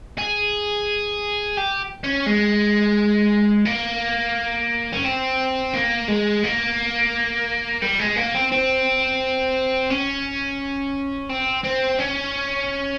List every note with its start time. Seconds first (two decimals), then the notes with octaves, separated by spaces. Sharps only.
0.18 G#4
1.57 G4
2.04 C#4
2.27 G#3
3.65 A#3
4.93 C#4
5.04 C4
5.74 A#3
6.08 G#3
6.43 A#3
7.82 G3
7.99 G#3
8.16 A#3
8.35 C4
8.52 C4
9.90 C#4
11.29 C4
11.64 C4
11.99 C#4